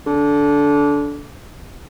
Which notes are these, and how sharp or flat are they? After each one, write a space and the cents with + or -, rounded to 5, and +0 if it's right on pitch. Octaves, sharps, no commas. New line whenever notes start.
D3 -20